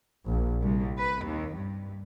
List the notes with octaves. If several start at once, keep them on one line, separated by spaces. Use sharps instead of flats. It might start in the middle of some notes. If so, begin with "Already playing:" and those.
A#1
C2
B4
D#2
G2